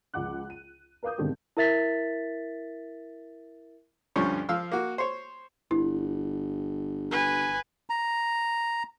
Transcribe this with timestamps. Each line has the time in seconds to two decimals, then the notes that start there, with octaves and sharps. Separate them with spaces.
0.14 C#2 F3 F#5 D6 F#6
0.50 D#7
1.03 A#4 B4 F5 D6 D#6 G6
1.18 G#2 B2 D3 D#3 G3 C4
1.57 E4 A#4 E5 A6 B6
4.16 D2 G2 F3 G3 C#4 C#5
4.49 F3 F5 E6 F6
4.72 A#3 F#4
4.98 C5 C#5
5.71 G1 E4
7.11 B4 G#5
7.90 A#5